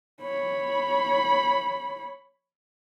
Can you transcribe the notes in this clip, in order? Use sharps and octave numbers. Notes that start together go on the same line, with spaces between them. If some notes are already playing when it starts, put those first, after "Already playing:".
C#5 B5